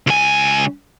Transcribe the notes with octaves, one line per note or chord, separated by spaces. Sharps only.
C#2 G#5